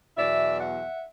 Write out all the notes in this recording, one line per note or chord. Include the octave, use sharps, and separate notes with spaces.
E2 B2 F#3 D5 E5
E5 F#5